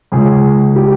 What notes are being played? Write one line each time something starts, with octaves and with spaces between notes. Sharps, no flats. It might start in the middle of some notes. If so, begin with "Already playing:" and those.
C#2 C#3 G#4
G4